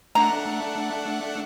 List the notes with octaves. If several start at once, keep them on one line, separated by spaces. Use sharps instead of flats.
A3 D4 F#5 A#5